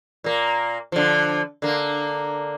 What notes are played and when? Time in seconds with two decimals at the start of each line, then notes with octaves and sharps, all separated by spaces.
0.24 A#2 A#3
0.92 D3 F3
1.62 D3 A#3